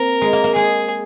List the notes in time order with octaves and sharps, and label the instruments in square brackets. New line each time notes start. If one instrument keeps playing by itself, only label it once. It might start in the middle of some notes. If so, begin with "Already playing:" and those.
Already playing: [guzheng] A#3 C4 [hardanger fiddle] A#4
[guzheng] G#3
A#3
A#3
[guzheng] G#3 [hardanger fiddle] G#4